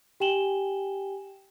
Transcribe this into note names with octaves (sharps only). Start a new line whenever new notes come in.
G4 G5 G#5 E7 F#7 G7